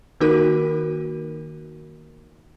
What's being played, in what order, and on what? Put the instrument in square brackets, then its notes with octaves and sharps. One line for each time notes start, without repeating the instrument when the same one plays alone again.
[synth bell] D#3 A#3 D#4 F#4 A#4 D#7